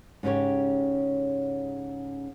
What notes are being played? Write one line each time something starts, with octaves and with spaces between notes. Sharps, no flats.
G#2 C#3 C#4 G4 C#5